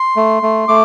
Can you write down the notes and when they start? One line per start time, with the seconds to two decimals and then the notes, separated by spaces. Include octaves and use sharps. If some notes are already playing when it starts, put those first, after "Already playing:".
Already playing: C6
0.17 A3
0.42 A3
0.68 A3 D6